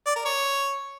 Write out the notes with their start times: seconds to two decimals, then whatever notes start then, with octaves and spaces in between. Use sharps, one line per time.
0.06 D5
0.16 A#4
0.26 C#5